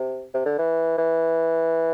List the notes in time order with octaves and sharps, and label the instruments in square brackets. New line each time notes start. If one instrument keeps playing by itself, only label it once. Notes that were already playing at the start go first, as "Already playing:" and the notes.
Already playing: [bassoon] C3
C3
D3
E3
E3